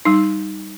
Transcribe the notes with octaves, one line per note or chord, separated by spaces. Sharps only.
G3 D#4